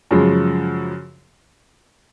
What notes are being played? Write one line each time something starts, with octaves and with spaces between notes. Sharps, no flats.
F#2 C#3 F3 G#3